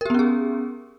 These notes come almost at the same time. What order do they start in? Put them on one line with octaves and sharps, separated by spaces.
A#4 G4 B3 C#4 G#4